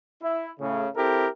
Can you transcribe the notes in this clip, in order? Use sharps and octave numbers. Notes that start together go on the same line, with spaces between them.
E4
A2 C#3
C4 E4 G4 A4 A#4